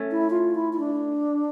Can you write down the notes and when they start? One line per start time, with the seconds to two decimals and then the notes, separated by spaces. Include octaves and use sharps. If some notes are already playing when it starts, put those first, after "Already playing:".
Already playing: A3 C#4
0.11 E4
0.30 F4
0.55 E4
0.73 E4
0.80 D4